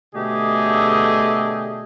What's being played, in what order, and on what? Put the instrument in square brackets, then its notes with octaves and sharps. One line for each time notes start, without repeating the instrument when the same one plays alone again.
[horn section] B2 D3 A3 G4 G#4 D#5